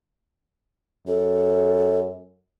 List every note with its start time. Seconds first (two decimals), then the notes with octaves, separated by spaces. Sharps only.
1.08 F#2 A4